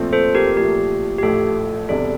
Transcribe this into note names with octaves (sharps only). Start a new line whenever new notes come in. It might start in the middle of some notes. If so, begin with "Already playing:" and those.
Already playing: A#2 F3 A3 C4
A4 C5
G4 A#4
A#2 F3 A3 G4
G4
A1 A2 F3 A3 A4
E1 E2 C3 G3 D4 A4